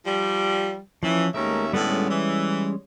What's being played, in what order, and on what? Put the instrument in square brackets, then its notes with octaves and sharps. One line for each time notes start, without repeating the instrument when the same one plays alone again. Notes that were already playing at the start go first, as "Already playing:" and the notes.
[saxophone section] F3 G3
[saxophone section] E3 [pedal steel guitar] F3 C#4
[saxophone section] D#2 C#4 E5 [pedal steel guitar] G#3 A3 A#4
[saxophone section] A2 D3 B3 [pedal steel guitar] G3 G#3 C#4
[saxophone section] E3